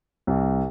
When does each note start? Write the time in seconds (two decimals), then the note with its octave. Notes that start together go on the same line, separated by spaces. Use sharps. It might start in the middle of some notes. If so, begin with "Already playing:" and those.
0.27 C2